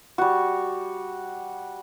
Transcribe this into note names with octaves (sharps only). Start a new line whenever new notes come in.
G3 F#4